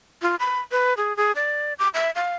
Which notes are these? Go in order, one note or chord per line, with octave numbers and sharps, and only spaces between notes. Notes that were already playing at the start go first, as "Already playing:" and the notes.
F4
B5
B4
G#4
G#4
D5
D6
E5
F5